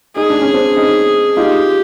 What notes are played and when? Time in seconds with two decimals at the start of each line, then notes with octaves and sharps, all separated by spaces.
0.16 D#4 G#4
0.30 D4
0.42 C#4
0.54 C4 D4
0.77 C#4 D#4
1.37 D#4 F4 G4